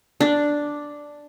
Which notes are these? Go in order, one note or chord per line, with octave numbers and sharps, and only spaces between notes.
D4